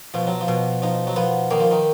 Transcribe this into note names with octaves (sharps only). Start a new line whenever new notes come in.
B2 F3
F#3
F3
B2
F3 D#4
F#3
F3 B3
D#3 A#3
F3
D#3